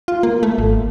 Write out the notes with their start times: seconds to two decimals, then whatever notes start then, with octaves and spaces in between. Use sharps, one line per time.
0.08 F4
0.23 A#3
0.43 A3
0.58 G#1